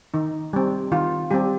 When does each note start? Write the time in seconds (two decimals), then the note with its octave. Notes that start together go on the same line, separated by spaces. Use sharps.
0.14 D#3 D#4
0.53 G3 C4
0.92 D#3 F4
1.31 G3 C4 G4